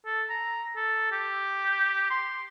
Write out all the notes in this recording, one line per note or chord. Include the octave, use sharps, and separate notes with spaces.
A4
A#5
A4
G4
C6